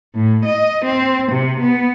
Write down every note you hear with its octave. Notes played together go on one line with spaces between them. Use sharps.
A2
D#5
C4
C3
B3